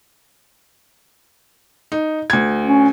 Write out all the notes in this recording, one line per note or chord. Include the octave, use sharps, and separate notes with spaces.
D#4
D2 G#6
C#4